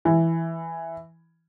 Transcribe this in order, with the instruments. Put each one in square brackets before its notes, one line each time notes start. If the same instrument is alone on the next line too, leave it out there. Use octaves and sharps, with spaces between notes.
[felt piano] E3